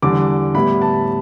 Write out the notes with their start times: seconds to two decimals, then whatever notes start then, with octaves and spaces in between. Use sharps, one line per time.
0.02 E2 D3 G3 D6
0.55 A2 G3 B3 E4 B5
0.82 A5